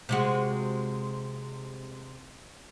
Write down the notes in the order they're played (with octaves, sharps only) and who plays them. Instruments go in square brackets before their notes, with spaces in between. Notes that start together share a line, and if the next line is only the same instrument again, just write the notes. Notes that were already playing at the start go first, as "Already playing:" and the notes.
[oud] C3 G#3 F#4